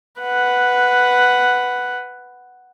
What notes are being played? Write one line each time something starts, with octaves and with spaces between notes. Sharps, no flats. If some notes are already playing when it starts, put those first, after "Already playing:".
B4 F#5